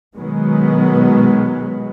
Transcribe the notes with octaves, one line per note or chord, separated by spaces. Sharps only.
B2 D#3 F#3 G#3 B3